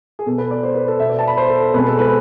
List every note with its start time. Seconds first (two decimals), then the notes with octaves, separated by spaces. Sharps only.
0.19 G#4
0.26 B2 B3 A4
0.38 B4
0.51 D5
0.63 C5
0.75 B4
0.88 A4
1.00 B2 B3 E5
1.10 D5
1.19 A5
1.28 B5
1.38 C5
1.50 A4
1.74 B2 G#3 C4 B4
1.87 A4
1.99 B4